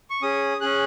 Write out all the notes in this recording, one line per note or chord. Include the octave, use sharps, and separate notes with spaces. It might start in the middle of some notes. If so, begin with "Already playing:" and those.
C#6
C#4 G#4 D#6
C#4 G#4 F#6